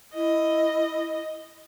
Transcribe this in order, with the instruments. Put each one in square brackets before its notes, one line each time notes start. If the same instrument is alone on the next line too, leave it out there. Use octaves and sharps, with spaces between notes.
[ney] E4 [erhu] D#5